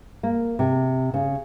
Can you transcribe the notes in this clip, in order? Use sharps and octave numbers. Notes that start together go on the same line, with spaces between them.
A#3
C3
C#3